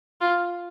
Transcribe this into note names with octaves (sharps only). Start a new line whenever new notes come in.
F4